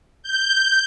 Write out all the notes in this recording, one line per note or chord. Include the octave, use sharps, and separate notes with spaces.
G6